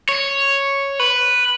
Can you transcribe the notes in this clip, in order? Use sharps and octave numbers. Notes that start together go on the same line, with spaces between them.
C#5
B4